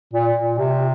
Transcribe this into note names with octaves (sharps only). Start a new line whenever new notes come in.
A#2
A#2
C3